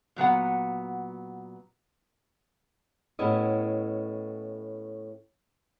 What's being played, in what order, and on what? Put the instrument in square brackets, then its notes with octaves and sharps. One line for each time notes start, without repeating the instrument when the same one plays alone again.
[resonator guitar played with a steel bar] A#2 F#3 B3 F#5
[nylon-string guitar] A2 B3 C#4 E4 G4 D#5